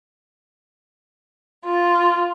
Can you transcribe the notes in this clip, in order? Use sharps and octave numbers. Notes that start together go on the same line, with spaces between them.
F4